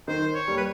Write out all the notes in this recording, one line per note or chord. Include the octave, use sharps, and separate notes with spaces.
D#3 C5
C#5
G3 A#3
B4